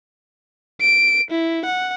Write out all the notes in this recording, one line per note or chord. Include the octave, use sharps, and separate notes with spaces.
D7
E4
F#5